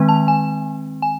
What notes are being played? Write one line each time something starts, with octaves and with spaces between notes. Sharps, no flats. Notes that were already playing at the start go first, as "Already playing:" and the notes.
Already playing: D#3 G#3 C4
A5
G#5
G#5